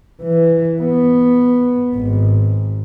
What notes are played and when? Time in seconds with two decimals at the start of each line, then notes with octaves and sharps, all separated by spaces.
0.22 E3
0.82 B3
1.95 G#1